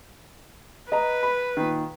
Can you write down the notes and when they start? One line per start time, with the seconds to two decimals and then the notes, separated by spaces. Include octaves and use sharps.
0.92 B4 D#5 A#5
1.23 B5
1.57 A#2 D#3